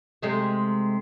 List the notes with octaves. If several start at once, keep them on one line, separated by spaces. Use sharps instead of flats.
C3 G#3 A3